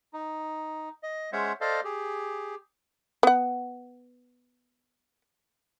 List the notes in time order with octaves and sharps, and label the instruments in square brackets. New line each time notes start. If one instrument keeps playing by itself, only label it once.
[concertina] D#4
D#5
G#3 C#4 C5 C#5 E5 F#5
A4 C5 D5 D#5 F5
G4 G#4
[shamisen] B3 F#5